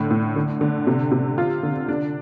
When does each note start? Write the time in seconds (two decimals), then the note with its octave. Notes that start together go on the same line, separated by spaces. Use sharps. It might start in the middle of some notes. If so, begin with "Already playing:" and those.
Already playing: A2 D3
0.11 A2
0.36 D3
0.61 D3
0.87 C3
1.12 C3
1.38 F4
1.63 D3
1.89 D4